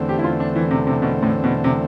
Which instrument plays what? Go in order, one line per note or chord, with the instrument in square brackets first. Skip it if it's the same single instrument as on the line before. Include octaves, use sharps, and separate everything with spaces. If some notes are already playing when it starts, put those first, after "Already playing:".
Already playing: [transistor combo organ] E2 D3 A3 C4
[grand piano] G4
E4
F4
D4
E3
C3
C3
B2
A2
B2
C3